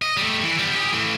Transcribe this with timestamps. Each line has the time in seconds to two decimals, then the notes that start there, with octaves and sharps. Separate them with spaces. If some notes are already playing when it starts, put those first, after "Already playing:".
0.02 D#5
0.17 G3 A3
0.44 E3
0.59 G3 B3
0.76 G4 G#4
0.92 E3 A3